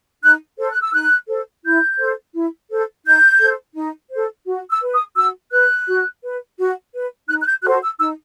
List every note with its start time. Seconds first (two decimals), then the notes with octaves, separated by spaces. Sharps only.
0.22 D#4 F#6
0.58 A4 C5
0.70 F#6
0.81 E6
0.93 D#4 F#6
1.28 A4 C5
1.64 E4 G6
1.99 A4 C5
2.34 E4
2.69 A4 C5
3.04 D#4 G6
3.40 A4 C5
3.76 D#4
4.11 A4 C5
4.46 F#4
4.70 E6
4.82 B4
4.93 D#6
5.16 F#4 E6
5.52 B4 F#6
5.87 F#4
6.23 B4
6.57 F#4
6.93 B4
7.28 D#4 F#6
7.41 F#6
7.46 G6
7.63 F#4 A4 C5 F#6
7.82 E6
7.99 D#4 E6